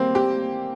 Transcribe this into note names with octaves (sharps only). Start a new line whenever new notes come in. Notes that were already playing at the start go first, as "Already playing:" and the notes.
Already playing: G3 A#3 C4
G4